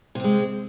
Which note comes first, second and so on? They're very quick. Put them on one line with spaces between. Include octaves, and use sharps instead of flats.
C3 C4 G#3